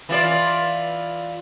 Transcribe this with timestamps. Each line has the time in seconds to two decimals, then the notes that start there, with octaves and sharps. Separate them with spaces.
0.09 E3 F4 D5